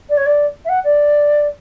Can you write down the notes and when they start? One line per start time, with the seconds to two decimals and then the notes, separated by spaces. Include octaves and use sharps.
0.09 D5
0.17 C#5
0.26 D5
0.65 E5
0.69 F#5
0.84 D5